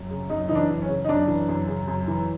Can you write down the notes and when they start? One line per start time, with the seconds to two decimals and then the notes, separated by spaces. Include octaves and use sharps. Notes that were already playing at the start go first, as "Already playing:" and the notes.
Already playing: F#2
0.09 C#3
0.29 F#2 D#4
0.49 E3 D#4
0.55 D4
0.69 F#2
0.82 C#4
0.88 C#3
1.04 D#4
1.08 F#2 D4
1.28 E3
1.48 F#2
1.68 C#3
1.88 F#2
2.08 E3